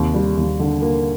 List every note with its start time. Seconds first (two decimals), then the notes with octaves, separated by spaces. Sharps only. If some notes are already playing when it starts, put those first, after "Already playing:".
Already playing: D#2 C3
0.14 G3
0.37 D#2
0.59 D3
0.82 A#3